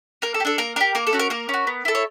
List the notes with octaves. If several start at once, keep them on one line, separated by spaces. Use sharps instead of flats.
A#3 A#4
A4
G4
D4 A4
A#3 A#4
D4 G4 A#4
A#3 A#4
A4
C#4 F#4
A#4
A#3 A#4
C#4 F#4
B3
E4 A4
C#5